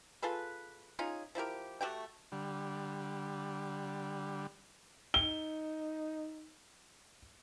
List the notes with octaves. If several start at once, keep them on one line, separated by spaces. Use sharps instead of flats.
F4 G#4 A4 B4
C#4 D#4 F4 G#4
F3 E4 G4 A#4
A3 F#4 G4 G5
D3 G3
D#4 G7